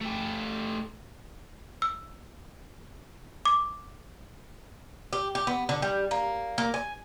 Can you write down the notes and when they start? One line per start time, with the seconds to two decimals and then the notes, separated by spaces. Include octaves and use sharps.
0.02 A3 G4
1.82 E6
3.45 D6
5.13 G4
5.35 G4
5.47 B3
5.69 D3
5.82 G3
6.11 A#3
6.58 A#3
6.74 G#5